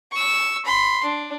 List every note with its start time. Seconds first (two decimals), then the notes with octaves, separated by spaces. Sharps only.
0.12 C#6 E6
0.65 B5 C6
1.04 D4